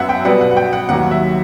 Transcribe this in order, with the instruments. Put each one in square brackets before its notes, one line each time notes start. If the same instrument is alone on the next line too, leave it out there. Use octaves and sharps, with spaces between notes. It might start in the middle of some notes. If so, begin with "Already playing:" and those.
Already playing: [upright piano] F#2 F#3 B3 E5 F#5
G5
B2 G3 B3 F#5
F#5
F#5
G5
F#5
D#2 D#3 F#3 F#5
E5